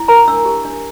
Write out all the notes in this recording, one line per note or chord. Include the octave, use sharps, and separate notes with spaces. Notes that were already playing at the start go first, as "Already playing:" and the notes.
Already playing: E4
A#4 A#5
D4 E6
G4
D4